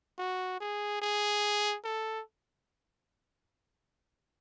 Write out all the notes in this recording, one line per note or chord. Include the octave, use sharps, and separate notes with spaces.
F#4
G#4
G#4
A4